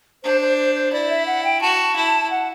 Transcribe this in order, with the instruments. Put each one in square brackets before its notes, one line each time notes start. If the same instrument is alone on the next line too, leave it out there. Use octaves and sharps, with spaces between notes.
[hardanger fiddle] D4 [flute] C5
[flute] C5
C5
C5
[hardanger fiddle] E4 [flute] D5
[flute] E5
F#5
G5
[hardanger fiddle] F#4 [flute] A5
[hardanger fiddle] E4
[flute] F#5